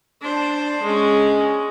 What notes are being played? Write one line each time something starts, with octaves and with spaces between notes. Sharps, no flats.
D4 C5
G#3 C#4